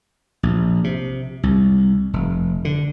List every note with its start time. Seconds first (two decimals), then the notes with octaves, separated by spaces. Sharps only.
0.43 A#1
0.84 C3
1.43 C2
2.13 F1
2.65 D3